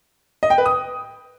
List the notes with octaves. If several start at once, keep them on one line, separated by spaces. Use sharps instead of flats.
D#5
G5
B4
D#6